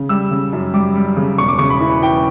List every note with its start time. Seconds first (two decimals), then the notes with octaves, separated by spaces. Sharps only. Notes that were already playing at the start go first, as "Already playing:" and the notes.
Already playing: C#3
0.09 G3 E6
0.31 C#3
0.53 F#2
0.73 G3 D6
0.95 G3
1.17 C#3
1.38 E1 C#6
1.48 D6
1.59 C#3 C#6
1.70 B5
1.80 E3
2.02 E3 G5